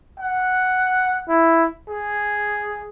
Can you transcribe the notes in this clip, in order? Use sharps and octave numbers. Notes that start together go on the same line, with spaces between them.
F#5
E4
G#4